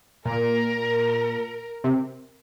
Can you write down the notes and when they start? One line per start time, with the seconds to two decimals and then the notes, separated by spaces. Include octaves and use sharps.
0.25 A#2 A#4
1.84 C3